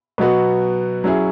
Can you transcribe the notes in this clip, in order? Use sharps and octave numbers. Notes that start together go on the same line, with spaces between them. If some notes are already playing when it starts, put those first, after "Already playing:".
B2 F#3 B3 F#4
F#3 C#4 E4 G#4